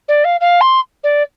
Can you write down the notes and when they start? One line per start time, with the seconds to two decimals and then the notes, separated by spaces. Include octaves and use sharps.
0.08 D5
0.24 F5
0.40 F5
0.61 C6
1.03 D5